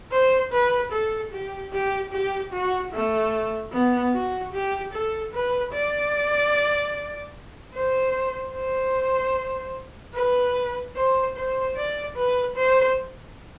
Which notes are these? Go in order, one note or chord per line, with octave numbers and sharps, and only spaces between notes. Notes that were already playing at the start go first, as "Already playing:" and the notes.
C5
B4
A4
G4
G4
G4
F#4
A3
B3
F#4
G4
A4
B4
D5
C5
C5
B4
C5
C5
D5
B4
C5